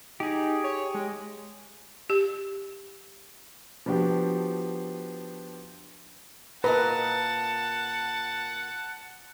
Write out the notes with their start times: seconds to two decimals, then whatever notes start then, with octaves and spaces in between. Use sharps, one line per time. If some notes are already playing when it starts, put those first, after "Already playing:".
0.20 D#4 G4 G#4
0.64 C#5
0.95 G#3
2.10 G4
3.86 F3 B3 D4 F#4 G4
6.64 A#2 A#4 B4 D#5 F#5 A5